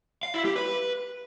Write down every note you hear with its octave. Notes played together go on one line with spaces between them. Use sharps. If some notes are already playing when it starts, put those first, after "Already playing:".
F5
E4
G4
B4